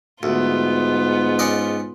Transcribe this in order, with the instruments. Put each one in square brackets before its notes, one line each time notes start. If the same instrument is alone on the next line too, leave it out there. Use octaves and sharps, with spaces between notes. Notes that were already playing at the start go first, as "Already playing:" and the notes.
[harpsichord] D2 [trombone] G#2 [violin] B3 F4
[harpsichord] C#4 D5 D#5